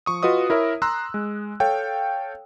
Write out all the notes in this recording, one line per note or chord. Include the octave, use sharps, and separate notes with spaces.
F3 C#6 D#6
F4 F#4 B4 D#5 D#6
E4 A#4 C#5 E5
A#5 C6 E6 F#6
G#3
A4 C#5 F5 G5